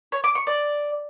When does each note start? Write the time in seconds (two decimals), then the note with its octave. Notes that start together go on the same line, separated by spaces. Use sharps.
0.12 C#5
0.24 D6
0.35 C#6
0.47 D5